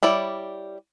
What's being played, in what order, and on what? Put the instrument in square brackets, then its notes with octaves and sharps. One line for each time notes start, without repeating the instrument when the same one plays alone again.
[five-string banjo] G3 E4 C#5 D5